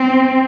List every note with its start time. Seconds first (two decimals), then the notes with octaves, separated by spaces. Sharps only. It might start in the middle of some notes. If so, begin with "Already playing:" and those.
Already playing: C4